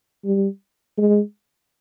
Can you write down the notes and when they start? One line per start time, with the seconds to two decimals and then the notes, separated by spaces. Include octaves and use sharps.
0.25 G3
0.98 G#3